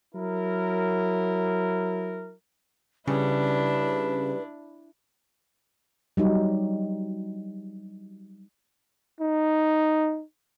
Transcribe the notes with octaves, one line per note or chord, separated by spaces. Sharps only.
F#3 E4 A#4
C#3 G3 D4 E4 B4
F#3 G3 D#4
D#4